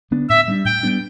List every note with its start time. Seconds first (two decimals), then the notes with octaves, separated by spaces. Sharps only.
0.11 D3 B3 D4
0.29 A2 E5
0.48 G3 B3 D4
0.65 A2 G5
0.83 G3 B3 D4